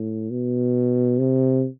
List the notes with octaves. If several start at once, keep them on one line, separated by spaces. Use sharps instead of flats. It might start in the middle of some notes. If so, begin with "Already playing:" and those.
Already playing: A2
B2
C3